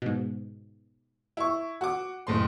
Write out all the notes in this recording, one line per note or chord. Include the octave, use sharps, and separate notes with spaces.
G#2 B2
E4 C#6
F#4 D6
F#1 A2 C6